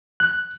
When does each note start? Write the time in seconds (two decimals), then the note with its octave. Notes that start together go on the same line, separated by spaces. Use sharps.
0.20 F#6